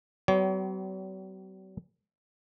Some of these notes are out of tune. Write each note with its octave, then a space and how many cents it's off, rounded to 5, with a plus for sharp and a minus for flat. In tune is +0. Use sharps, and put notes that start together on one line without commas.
F#3 +45 C4 -45 C#5 +40